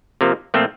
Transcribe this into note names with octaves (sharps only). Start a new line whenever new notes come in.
C3 F3 A#3
A#2 F3 A3 C4